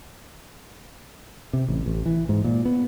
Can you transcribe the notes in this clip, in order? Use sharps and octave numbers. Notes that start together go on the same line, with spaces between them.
C3
A1
A1
E3
G#2
A#2
B3